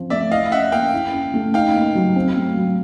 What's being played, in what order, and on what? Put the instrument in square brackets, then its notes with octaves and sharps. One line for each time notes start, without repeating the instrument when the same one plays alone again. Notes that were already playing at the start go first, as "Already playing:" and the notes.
Already playing: [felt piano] F3 C4
[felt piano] A3 [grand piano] D5 E5
[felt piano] E4 [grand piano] D#5 F5
[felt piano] C#4 [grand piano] E5 F#5
[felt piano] A#3 [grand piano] F5 G5
[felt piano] E4
C#4
A3
[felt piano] D#4 [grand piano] F5 G5
[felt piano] A#3
F#3
C4
A3
F#3